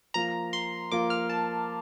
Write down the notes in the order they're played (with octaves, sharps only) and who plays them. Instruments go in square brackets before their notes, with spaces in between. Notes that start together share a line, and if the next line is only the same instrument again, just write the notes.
[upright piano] F3 A#3 F4 [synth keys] A#5
[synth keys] C6
[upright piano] F3 A#3 F4 [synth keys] D6
[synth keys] F6
A5